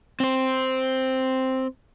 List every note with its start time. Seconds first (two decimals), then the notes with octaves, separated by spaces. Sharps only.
0.20 C4 C5